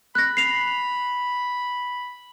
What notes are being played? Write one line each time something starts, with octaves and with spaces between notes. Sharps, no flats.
B5 F#6 A#6
C7 F7